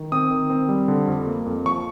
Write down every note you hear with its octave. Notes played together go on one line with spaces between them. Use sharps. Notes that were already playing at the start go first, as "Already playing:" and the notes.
Already playing: D#3
C4 D#6
D#3
C4
G3
D3
F2
A#3
F2
F3 C#6